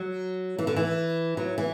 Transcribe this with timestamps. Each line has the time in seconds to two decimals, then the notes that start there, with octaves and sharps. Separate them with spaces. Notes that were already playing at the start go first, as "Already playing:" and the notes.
Already playing: F#3
0.59 E3
0.67 D3
0.76 E3
1.37 F#3
1.58 E3